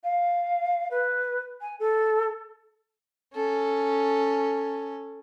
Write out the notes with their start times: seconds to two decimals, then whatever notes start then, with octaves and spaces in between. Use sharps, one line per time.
0.04 F5
0.91 B4
1.61 G#5
1.79 A4
3.34 C#4 A4